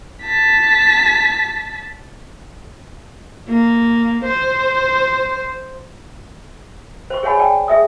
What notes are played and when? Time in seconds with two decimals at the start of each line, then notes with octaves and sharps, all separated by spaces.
0.22 A5 B6
3.49 A#3
4.25 C5
7.10 C5 C#6
7.23 G#4 C#5 F#5 G#5 B5
7.37 D5 G5 A5
7.68 G#4 E5 D#6